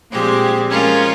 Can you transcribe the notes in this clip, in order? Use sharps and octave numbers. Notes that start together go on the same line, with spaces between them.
A#2 F3 G#3 C4 G4
F3 G#3 C#4 F4 A#4